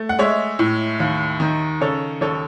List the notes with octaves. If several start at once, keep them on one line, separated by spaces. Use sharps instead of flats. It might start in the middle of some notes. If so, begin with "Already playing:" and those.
Already playing: A3
F#5
G#3 C#5 E5
A2
D#2
D#3
C#3 A4 C#5
D#2 A4 C#5